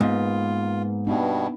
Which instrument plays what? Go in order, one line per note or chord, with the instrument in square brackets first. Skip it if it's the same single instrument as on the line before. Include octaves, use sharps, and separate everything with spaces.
[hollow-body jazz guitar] G#2 [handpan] A#3 B3 [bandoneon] F4
[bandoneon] G2 B2 [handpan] B3 D4 D#4